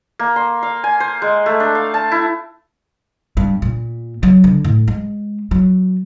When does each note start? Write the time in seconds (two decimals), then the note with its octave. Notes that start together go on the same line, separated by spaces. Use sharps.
0.19 A#3
0.36 C6
0.63 F5
0.84 G#5
1.00 C5
1.22 G#3
1.46 A3
1.60 D4
1.75 F5
1.94 A5
2.12 E4
3.37 G2
3.62 A#2
4.23 F#3
4.44 D3
4.64 A2
4.88 G#3
5.51 F#3